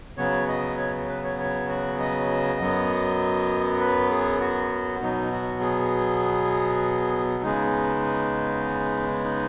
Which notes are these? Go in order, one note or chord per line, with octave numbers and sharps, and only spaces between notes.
C#3 F#3 B3 C#5
D#5
C#5
B4
C#5
C#5
F#4
D#5
F#2 F#3 B3
B4
G#4
F#4
B2 F#3 B3 D#4
F#4
G#4
C#3 G#3 B3 D#4
D#4